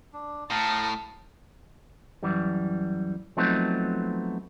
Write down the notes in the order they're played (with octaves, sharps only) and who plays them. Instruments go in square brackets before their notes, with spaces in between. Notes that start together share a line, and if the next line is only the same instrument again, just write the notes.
[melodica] D4
[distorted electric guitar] A2 [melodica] F5 A#5 D#6 [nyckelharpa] A5
[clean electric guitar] F#2 E3 G3
F3 F#3 A3 B3 C4 D#4